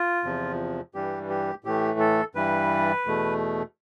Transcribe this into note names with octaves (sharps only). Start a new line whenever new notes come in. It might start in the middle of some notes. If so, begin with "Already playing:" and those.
Already playing: F4
E2 C3 F3
G2 E3 G3 G4
G4
A2 E3 A3 G4
A4
G2 E3 G3 B4
E2 B2 A3